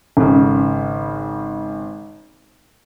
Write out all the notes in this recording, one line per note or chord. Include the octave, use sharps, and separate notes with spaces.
G#1 C#3